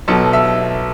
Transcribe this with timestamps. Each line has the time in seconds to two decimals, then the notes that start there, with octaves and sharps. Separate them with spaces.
0.08 B1 B2 A4 A5
0.33 E5 E6